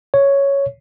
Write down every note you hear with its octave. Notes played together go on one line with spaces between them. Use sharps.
C#5